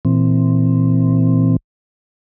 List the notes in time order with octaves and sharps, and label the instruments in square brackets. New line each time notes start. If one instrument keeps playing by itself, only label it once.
[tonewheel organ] A#2 E3 C4